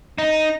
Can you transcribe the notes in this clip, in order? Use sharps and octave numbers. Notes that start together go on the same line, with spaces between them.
D#4